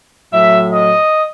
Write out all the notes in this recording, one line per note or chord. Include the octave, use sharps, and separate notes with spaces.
A2 F#3 E5
D#5